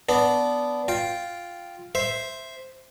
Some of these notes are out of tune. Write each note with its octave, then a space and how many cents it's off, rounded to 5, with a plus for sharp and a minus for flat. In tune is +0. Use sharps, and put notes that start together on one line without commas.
B3 +0 D4 -15
F4 +0 G5 +0
C5 +0 E5 +0